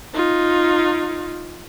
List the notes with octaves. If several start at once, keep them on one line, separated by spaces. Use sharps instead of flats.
D#4 F4